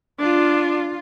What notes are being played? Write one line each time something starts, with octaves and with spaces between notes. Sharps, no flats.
D4 F4